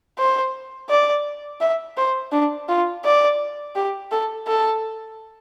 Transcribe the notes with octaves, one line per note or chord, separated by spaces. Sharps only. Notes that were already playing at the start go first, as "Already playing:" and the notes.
C5
D5
E5
C5
D4
F4
D5
G4
A4
A4